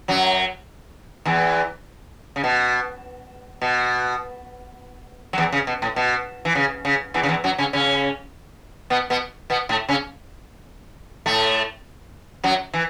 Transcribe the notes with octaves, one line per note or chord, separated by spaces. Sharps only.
F#2 F#3
E2 E3
C#3
B2
B2
F#3
E2 E3
C#3
B2
A2
B2
E3
C#3
C#3
E2 E3
C#3
E2 E3
F#2 F#3
C#3 C#4
C#3 C#4
B2 B3
B2 B3
B2 B3
A2 A3
C#3 C#4
A2 A3
F#2 F#3
E3